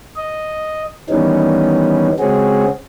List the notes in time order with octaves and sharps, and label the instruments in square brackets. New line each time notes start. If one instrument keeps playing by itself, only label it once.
[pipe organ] D#5
D#3 E3 G3 B3 C#4 D#4
C#3 G#3 C4 C#4 F#4 G#4